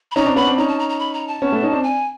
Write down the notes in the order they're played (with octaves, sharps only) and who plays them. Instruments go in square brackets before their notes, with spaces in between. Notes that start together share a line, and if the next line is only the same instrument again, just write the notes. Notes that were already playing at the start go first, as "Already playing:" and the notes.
[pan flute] B5
[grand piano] C#4 D#4 [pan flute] A#5
[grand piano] C4 D4
[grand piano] B3 C#4 [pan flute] B5
[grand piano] C4 D4
[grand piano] C#4 D#4 [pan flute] A#5
[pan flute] A5
A#5
A#5
B5
A#5
A5
[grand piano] B3 C#4
A3 B3
C#4 D#4
C4 D4
[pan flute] G#5